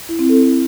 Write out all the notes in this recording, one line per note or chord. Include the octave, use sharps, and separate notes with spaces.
E4
C4
A4